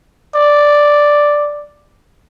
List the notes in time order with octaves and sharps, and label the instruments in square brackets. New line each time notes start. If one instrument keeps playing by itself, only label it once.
[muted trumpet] D5